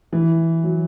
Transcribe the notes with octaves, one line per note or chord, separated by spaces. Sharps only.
E3
F#3